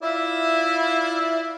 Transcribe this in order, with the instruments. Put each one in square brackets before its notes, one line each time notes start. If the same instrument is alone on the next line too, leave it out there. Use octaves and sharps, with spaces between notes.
[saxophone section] E4 F4 D5 E5